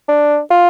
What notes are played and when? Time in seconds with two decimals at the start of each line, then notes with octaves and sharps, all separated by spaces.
0.08 D4
0.50 F4